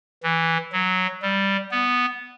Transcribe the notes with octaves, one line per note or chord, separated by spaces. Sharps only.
E3
F#3
G3
B3